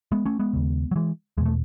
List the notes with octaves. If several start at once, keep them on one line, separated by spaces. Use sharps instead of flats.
G#3 B3
A3 C#4
G#3 B3
D#2 C#3
F#3
E3 G#3
E2 B2 G#3 A3